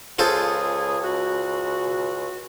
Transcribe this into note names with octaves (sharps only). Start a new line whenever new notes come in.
C#2 F4 G#4 A4 C5
F#4